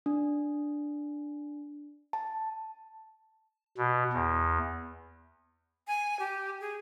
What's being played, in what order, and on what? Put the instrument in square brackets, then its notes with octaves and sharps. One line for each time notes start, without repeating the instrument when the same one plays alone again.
[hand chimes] D4
A5
[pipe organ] B2
E2
[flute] G#5
G4
G#4